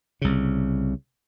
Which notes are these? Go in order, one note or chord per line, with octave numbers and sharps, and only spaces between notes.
C2 C#3